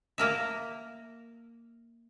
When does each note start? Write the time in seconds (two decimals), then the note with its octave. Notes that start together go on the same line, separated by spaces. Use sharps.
0.18 A#3 A#4 E5